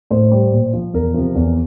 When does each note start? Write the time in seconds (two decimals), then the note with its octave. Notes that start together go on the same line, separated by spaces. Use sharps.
0.11 A2 C5
0.32 G3
0.52 A#2
0.73 F3
0.94 E2 A#4
1.14 C3 F3
1.35 E2